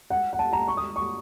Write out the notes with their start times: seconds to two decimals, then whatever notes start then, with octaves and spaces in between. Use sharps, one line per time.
0.10 F#5
0.33 F#5
0.39 A5
0.53 A#5
0.68 C#6
0.77 D#6
0.96 C#6